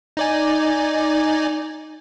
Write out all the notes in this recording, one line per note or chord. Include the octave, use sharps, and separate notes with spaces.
D#4 D5 G#5